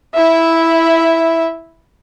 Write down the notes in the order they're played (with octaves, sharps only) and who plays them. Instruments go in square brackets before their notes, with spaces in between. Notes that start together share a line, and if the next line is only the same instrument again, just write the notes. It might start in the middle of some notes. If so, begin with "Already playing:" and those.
[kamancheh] E4 E5